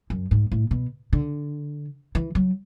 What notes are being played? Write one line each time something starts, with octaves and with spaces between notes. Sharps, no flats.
F#2
G#2
A2
B2
D3
E3
F#3